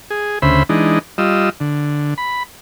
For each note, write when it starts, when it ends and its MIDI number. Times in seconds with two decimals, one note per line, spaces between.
0.10 0.39 68
0.42 0.63 38
0.42 0.63 49
0.42 0.63 72
0.42 0.63 76
0.42 0.63 83
0.69 0.99 52
0.69 0.99 56
0.69 0.99 62
0.69 0.99 63
1.18 1.50 55
1.18 1.50 65
1.18 1.50 75
1.18 1.50 88
1.60 2.14 50
2.18 2.43 83